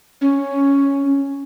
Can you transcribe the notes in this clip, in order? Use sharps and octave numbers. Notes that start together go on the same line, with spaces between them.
C#4